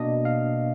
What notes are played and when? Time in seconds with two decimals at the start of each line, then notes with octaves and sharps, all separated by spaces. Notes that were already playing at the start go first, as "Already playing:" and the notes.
Already playing: B2 A#3 D4 D#5
0.25 F5